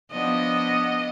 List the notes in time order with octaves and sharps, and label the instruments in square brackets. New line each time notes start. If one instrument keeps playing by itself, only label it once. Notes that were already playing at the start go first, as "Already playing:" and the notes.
[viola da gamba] F3 B3 D4 [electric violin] D#5